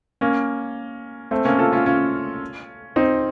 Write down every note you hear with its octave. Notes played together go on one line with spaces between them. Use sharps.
A#3 C#4
A3 C4
A#3 C#4
F4 A4
C#4 F4
C#4 F4
C4 D#4